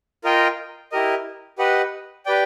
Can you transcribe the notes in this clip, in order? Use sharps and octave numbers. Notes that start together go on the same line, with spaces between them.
F4 A#4 D#5 G5
E4 G4 A#4 D#5
G4 B4 D#5 F#5
G4 B4 D5 G5